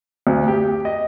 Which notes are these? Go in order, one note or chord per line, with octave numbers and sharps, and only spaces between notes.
D2
G4
D#5